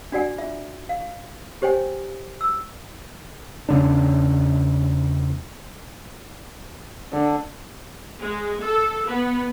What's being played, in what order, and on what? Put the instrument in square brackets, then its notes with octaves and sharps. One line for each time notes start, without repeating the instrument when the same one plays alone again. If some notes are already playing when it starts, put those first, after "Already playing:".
[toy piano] D4 F#4 D5 F#5 G#5
F4 E5
F5
G4 C5 C#5 G5 G#5
E6
[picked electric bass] E2 C#3 D4
[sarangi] D3
[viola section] G#3
A4
B3